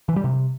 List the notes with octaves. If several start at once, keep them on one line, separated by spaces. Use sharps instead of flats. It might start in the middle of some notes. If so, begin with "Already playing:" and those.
E3
G3
C3